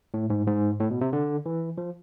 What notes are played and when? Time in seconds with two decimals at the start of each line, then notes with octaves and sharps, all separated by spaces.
0.14 A2
0.30 G#2
0.47 G#2
0.80 A2
0.91 B2
1.01 C3
1.13 D3
1.46 E3
1.78 F3